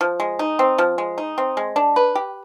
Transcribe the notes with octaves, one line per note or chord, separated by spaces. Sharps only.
F3
G#3
D#4
C4
F3
G#3
D#4
C4
G#3
D4
B4
G4